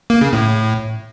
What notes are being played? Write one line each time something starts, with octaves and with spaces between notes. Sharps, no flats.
A#3
C#3
A2